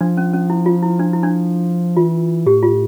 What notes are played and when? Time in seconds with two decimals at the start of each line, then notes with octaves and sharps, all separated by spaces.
0.01 F3 D4
0.17 C#4
0.33 C#4
0.50 E4
0.66 F4
0.82 E4
0.99 D4
1.13 E4
1.23 D4
1.97 E3 F4
2.46 A2 G4
2.63 F4